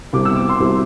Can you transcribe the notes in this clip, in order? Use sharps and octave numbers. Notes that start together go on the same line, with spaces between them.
C2 C3 G3 D6
E6
D6
C6
C2 C3 G3